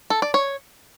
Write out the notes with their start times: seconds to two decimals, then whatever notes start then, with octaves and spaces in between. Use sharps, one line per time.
0.10 A4
0.22 D5
0.34 C#5